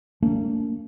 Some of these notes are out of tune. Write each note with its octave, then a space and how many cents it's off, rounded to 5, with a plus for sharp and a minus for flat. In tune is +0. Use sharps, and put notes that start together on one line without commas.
A#3 -40 D4 -40